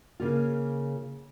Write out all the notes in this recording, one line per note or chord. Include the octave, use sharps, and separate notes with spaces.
C#3 A#3 F4